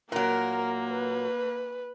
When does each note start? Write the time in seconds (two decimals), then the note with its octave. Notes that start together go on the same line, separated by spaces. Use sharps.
0.12 A#2 F#3 A#3 A#4
0.90 B4